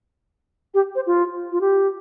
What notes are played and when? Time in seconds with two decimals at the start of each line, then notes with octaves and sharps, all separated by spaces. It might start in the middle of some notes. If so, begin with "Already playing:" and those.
0.74 G4
0.95 C5
1.07 F4
1.52 F4
1.61 G4